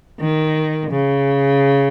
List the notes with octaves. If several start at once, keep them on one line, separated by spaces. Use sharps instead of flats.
D#3
C#3